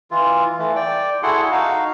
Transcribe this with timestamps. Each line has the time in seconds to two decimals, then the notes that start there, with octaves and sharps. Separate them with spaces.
0.11 E3 F4
0.58 E3 A3
0.76 D5 G5
1.23 E4 F#4 G#4 A4 F#5 C6
1.52 D#4 F#4 F5